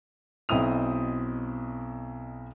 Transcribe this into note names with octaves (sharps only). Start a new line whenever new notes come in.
B1 B2 C4 E4 D#6 F7